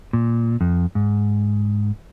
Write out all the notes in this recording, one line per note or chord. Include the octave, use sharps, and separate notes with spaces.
A#2
F2
G#2